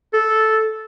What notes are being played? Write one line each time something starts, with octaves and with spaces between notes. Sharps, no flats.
A4